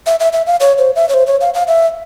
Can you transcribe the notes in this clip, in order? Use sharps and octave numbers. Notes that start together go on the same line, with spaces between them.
E5
E5
E5
F5
C#5
C5
E5
C#5
C5
C#5
F5
F5
E5